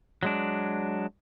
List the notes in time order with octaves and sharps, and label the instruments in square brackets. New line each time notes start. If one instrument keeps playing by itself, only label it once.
[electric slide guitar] F#3 G#3 D4